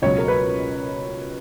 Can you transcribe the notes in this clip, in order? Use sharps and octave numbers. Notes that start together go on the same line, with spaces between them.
C#2 B2 F#3 C#5
A#4
B4